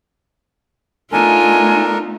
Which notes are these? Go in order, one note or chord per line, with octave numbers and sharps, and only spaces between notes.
A3 B3 D4 D#4 F4 A4 A#4 G#5